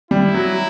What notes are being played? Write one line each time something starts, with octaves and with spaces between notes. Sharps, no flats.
G3 E4
F#3